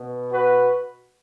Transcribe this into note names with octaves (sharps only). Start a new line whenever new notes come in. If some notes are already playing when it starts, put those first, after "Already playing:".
Already playing: B2 B3
F#4 B4